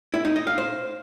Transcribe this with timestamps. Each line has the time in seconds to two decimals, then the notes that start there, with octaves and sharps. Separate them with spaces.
0.14 E4
0.25 D#4
0.36 D#5
0.47 F5
0.58 C5